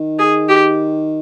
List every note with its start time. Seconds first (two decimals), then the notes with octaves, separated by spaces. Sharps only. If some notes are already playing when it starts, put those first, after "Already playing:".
Already playing: D#3
0.19 G#4
0.49 G4